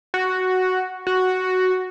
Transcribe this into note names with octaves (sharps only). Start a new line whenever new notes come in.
F#4
F#4